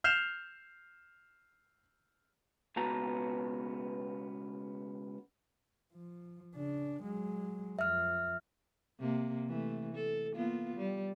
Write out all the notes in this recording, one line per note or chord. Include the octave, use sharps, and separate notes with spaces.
F6 G6 C7 E7 F7
C#2 B2 B3 A5 A#5
F3
C#3 D4
F#3 G#3
F2 F3 E5 F6
C3 A#3
E3 A3
A4
A#3 B3 F4
G3